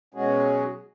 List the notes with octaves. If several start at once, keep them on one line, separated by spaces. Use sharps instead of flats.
B2 F#3 G#3 C#4 F#4 G#4